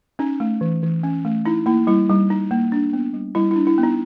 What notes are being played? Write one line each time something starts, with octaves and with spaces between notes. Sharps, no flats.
C#4 D#4
A3
E3
E3
C#4
A3
D#4 E4
A#3 E4
G3 E4
G3 D#4
D#4
A#3
D4
B3
G3
G3 E4
D4 E4
E4
B3
D#4